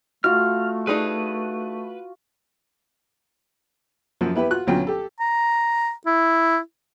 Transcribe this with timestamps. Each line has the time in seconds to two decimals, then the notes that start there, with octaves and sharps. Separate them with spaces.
0.24 A3 F4 F#4 F6
0.87 D4 D#4 G#4 B4
4.21 F#2 F3 F#3
4.36 B3 E4 G4 B4
4.51 F4 F#4 F#6
4.67 D2 B2 F#3 C#4 F4 G5
4.87 G4 A4
5.20 A#5
6.07 E4